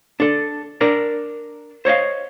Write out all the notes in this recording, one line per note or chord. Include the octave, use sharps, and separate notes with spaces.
D4 A4
D4 A#4 D5
C5 C#5 D#5 F5